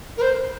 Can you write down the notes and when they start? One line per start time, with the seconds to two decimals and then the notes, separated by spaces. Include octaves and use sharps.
0.17 A#4
0.21 C5